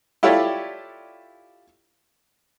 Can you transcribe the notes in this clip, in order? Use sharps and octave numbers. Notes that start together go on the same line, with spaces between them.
E4 F4 G4 A4 C#5 D5